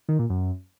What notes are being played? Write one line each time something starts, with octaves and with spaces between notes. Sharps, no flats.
D#3
A#2
F#2